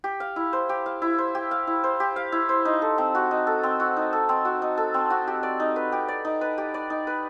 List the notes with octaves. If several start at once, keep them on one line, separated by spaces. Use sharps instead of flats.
G4
F5
E4
C5
G4
F5
E4
C5
G4
F5
E4
C5
G4
F5
E4
C5
D#4
A4
C4
F#4
D#4
A4
C4
F#4
D#4
A4
C4
F#4
D#4
A4
C4
F#4
G4
D5
D#4
B4
G4
D5
D#4
B4
G4
D5
D#4
B4